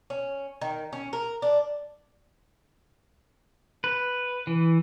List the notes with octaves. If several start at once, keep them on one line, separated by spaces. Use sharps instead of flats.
C#4
D#3
C#4
A#4
D4
B4
E3